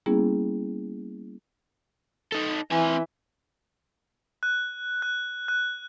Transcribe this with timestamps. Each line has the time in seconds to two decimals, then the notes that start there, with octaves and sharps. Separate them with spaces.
0.06 G3 A#3 B3 C#4 E4 G#4
2.32 D#4 A4
2.72 E3 C4 G#5
4.43 F#6
5.02 F#6
5.48 F#6